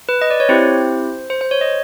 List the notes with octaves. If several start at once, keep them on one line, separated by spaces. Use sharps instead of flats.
B4
D#5
D5
C#5
C4 E4 G4 C5
C5
C5
C#5
D#5